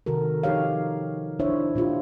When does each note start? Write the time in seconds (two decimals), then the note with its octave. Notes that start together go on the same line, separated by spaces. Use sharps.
0.06 C3 D#3 F#4 A4 A#4
0.43 F3 D#4 G4 C#5 F5
1.40 D4 E4 C5 C#5 E5
1.75 A#2 D4 F4 G4